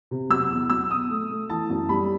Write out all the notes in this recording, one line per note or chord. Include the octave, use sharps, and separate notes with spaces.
C3
F#3 E6
E2
F#3 E6
B2 D#6
A3
A3
E3 A5
F#2
G3 B5